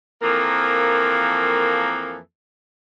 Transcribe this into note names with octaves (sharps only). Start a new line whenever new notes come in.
F2 E3 F3 A#3 A4 A#4